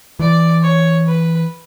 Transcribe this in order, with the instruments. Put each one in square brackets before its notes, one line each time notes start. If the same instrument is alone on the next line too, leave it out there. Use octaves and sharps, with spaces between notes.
[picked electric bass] E3 [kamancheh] D5
[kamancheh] C#5
B4